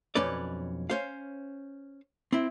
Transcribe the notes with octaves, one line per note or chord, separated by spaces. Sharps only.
B1 F2 C#4 B4 D5
C#4 C5 F5
C4 E4